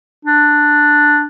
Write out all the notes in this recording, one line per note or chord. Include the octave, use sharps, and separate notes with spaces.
D4